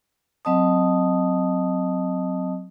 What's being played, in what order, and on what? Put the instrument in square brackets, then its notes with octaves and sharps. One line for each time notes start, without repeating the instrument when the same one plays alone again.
[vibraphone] F#3 C4 D#5 A5 D#6